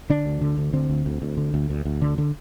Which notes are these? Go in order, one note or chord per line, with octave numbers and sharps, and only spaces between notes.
D3 D4
D2
D3
D2
D3 C4
D2
D2
D2
D3
D2
D2
D2
D3
D3